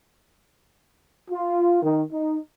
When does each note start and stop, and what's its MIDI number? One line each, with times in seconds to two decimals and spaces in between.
1.31 1.82 65
1.83 2.03 51
2.12 2.38 63